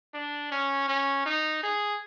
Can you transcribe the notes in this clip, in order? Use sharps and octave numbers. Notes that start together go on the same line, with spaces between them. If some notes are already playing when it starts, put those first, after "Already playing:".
D4
C#4
C#4
D#4
G#4